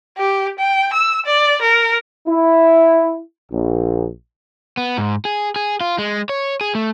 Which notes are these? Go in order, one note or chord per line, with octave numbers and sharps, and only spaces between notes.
G4
G5
E6
D5
A#4
E4
A#1
B3
G#2
G#4
G#4
F4
G#3
C#5
G#4
A3